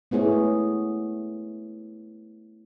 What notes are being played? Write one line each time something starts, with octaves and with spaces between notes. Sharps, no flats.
A3 B3 E4 G#4 C#5